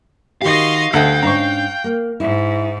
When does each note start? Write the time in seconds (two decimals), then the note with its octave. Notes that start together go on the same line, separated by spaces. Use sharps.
0.42 D#3 F#4 G4 D#5 F5 C6 C#6
0.93 D2 A4 D#5 F#5 G5
1.23 G#2 C#4 D4 A#5 C#6
1.84 A#3
2.20 G#2 E4